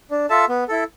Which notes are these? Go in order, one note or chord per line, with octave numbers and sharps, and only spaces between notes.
D4
F4 A4 E5 A5
B3
E4 A4